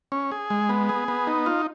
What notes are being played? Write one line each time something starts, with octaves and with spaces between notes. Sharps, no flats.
C#4
G#4
G#3
B3
G#4
B3
D#4
F4